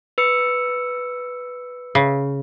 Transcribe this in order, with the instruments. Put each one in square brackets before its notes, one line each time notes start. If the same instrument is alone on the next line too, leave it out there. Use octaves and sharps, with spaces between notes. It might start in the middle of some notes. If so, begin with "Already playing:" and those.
[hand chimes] B4 E6 C#7
[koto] C#3